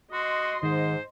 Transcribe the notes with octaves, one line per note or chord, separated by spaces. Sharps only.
F#4 D#5 C6
G#2 D#3 C5